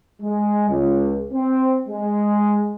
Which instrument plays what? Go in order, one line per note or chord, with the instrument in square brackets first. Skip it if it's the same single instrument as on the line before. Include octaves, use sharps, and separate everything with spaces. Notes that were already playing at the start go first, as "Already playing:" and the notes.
[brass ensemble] G#3
C#2
C4
G#3